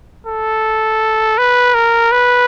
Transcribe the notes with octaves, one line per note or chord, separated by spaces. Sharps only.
A4
B4
A#4
B4